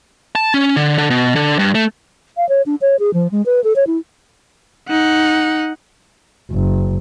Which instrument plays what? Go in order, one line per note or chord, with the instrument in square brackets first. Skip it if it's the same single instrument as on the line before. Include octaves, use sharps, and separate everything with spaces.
[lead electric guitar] A5
C#4
D3
D3
B2
D3
G2
A3
[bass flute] F5
C#5
D4
C#5
G#4
F3
G#3
B4
A4
C#5
E4
[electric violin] D#4 F#5
[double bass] F#1